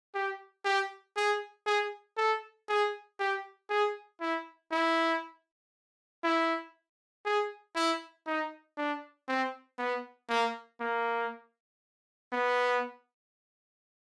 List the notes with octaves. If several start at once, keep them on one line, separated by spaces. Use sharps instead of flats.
G4
G4
G#4
G#4
A4
G#4
G4
G#4
E4
E4
E4
G#4
E4
D#4
D4
C4
B3
A#3
A#3
B3